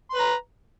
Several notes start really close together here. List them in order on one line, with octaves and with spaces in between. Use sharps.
C6 B4 A#5